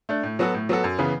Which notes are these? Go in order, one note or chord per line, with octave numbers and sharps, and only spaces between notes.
A3 D4
A2
F#3 B3 F#4 A4
A2
F#3 B3 F#4 A4
F#2
C#3 E3 B3